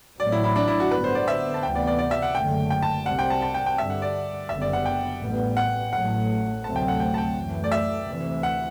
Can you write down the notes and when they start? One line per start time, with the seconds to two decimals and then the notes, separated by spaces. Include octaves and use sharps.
0.20 A1 A2 F#3 C4 D5
0.32 E4
0.44 E4
0.56 D4
0.68 E4
0.80 F#4
0.91 G2 D3 G3 B3 B4
1.04 C5
1.15 D5
1.28 E5
1.54 A5
1.63 D2 C3 E3 B3 G5
1.75 D5
1.87 D5
1.99 D5
2.11 E5
2.22 F#5
2.34 F#1 F#2 D3 A3 G5
2.70 G5
2.83 A5
3.06 C2 C3 G3 C4 F#5
3.19 G5
3.30 A5
3.42 A5
3.54 G5
3.66 G5
3.78 G2 D3 G3 E5
3.90 F#5
4.02 D5
4.49 F#1 F#2 D3 G3 B3 E5
4.62 D5
4.73 F#5
4.86 G5
5.21 A1 A2 G3 B3
5.57 F#5
5.93 A1 A2 F#3 A3 F#5
6.64 D2 C3 F#3 A3 C4 A5
6.76 G5
6.88 F#5
7.00 G5
7.14 A5
7.18 G5
7.36 F#2 E3 A3
7.64 D5
7.72 E5
8.08 D2 C3 E3
8.43 F#5